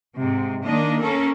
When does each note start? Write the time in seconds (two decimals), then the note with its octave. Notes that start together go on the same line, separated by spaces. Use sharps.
0.15 G#2 C3
0.63 D#3 A#3 D4 D#5
1.01 A#3 C#4 A4 A#4